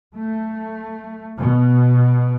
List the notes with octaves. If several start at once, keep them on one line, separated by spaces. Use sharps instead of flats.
A3
B2